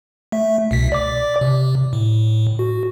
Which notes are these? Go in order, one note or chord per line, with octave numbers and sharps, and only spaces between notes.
A3 E5
C2 B2 B6
D5 D6
C3
A2
F#4